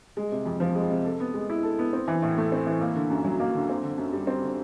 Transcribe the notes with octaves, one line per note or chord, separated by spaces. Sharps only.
G#3
C3
F2
F3
G#3
C3
A4
B3
G#3
E4
A4
B3
C4
E3
A2
A3
C4
E3
A#3
D3
F#2
F#3
A#3
D3
C4
D3
F#2
G3
C4
D3